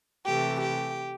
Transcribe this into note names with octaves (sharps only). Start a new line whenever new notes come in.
C3 E3 A3 G4
G4